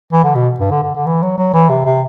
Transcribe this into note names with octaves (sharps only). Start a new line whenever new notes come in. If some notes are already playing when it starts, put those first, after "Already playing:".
E3
D3
B2
G2
D3
D3
D3
E3
F#3
F#3
E3
C3
C3